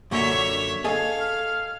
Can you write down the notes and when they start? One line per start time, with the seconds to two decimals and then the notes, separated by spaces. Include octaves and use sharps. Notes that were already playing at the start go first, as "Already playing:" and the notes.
0.11 F#2 A#2 D3 C#5 E5 C#6
0.84 G#4 A4 D#5 F5 G#6
1.20 F6